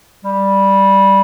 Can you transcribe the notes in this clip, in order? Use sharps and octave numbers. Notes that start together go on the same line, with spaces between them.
G3